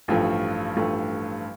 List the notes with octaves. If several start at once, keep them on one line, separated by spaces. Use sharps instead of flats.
A1 G2 F3 A3
A1 G2 F3 A3